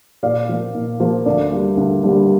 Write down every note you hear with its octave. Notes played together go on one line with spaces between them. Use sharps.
A#2 D5 F5
F3 A#3
A#2
F3 A#3
D2 D5
D3 G3 A#3
D2
D3 G3 A#3